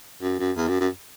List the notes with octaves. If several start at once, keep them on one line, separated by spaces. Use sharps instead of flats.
F#2
F#2
E2
F#2
F#2